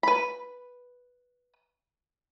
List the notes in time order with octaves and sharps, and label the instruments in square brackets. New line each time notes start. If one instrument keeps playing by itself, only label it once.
[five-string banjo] B4 B5